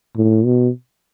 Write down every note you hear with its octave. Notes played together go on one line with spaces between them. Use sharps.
A2
B2